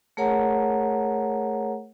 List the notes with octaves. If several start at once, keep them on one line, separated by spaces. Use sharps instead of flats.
A3 G#4 A#4 C#5 F#5 A#5